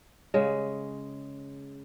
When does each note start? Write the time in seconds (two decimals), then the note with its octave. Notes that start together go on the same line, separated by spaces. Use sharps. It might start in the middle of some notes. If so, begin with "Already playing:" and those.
0.34 C#3 G#3